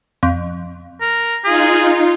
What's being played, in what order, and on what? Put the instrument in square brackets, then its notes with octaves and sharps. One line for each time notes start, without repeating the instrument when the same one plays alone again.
[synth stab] F2
[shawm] A#4
[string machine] D#4 F4 [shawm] G#4